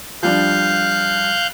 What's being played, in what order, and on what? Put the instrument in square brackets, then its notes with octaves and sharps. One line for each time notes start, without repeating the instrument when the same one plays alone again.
[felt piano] F3 G3 D4 [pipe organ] F5 F#6 G6